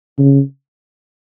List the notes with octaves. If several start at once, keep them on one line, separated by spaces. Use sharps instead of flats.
C#3